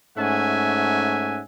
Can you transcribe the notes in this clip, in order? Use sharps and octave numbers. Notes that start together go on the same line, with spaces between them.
G#2 A3 C#4 E5 F#5 G#5